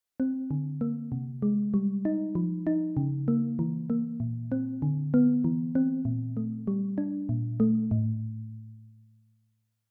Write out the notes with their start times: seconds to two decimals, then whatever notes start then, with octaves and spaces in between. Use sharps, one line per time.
0.20 C4
0.51 D3
0.81 A#3
1.12 C3
1.42 G#3
1.74 G3
2.05 D#4
2.35 F3
2.67 D#4
2.97 C#3
3.28 A#3
3.59 E3
3.90 A#3
4.20 A#2
4.52 C4
4.82 D3
5.14 B3
5.44 E3
5.75 C4
6.05 A#2
6.37 A3
6.67 G3
6.98 D4
7.29 A#2
7.60 A3
7.91 A2